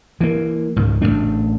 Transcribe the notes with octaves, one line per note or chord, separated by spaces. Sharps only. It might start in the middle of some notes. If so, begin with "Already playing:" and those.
E3 A#3
C#2 G#2
A1 F#3 A3 D4